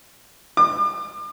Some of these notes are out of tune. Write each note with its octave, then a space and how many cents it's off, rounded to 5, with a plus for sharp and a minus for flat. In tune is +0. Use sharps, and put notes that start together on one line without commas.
D6 +35